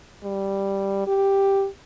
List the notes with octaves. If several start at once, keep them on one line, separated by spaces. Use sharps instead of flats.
G3
G4